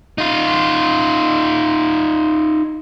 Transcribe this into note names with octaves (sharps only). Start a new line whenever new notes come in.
D#4 F4